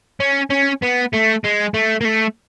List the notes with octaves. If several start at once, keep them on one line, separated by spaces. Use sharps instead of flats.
C#4
C#4
B3
A3
G#3
A3
A#3
A3